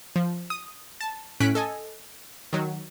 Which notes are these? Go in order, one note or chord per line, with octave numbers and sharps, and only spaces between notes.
F3
D#6
A5
A2 C#4 F#6 B6 D7
A4 D#5 G#5
D#3 F#3